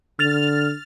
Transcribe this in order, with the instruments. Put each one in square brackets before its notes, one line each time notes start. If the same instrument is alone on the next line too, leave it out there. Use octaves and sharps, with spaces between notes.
[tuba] D3 [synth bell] F6 A6 F7